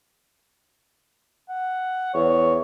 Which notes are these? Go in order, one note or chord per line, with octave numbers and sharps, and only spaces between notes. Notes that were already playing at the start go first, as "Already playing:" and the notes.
F#5
E2 C#5